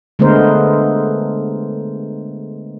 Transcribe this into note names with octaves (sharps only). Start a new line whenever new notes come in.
D3 G#3 A3 B3 A#4 C5